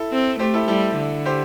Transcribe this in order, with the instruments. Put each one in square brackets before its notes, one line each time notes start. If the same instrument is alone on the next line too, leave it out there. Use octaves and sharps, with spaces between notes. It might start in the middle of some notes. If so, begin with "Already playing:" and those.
Already playing: [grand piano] E4 A4
[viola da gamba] C4
[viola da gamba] A3 [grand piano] G4 C5
[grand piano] E4 A4
[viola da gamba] G3 [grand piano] E4 A4
[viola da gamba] D3
[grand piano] G4 C5